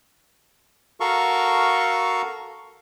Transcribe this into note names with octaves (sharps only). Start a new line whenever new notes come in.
F#4 A4 A#4 F5 C#6